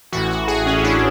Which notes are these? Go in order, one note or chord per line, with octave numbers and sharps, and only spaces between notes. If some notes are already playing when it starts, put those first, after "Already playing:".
A1 A2 E3 F#4
F#4
G#4
C#4
E4
D4